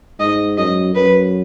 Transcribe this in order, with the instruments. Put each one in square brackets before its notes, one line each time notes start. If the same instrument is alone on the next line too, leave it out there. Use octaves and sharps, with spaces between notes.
[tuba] G#2 [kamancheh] D#5
[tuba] F#2 [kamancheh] D#5
[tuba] F#2 [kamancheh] B4